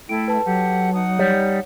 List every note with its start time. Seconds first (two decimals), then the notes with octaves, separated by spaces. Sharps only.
0.09 A3 E4 A4 G5 D7
0.28 B4 A5
0.46 F#3 G4 A4 F#5
0.94 D#4 F#5 D#6
1.19 G3 C#5